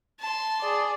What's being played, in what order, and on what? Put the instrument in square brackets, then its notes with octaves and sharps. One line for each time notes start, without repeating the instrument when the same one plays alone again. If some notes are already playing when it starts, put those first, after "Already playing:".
[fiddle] A5 C6
[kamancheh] G#4 D5